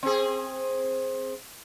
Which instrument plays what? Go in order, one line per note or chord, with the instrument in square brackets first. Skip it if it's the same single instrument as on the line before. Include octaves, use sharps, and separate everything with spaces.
[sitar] C4 G#4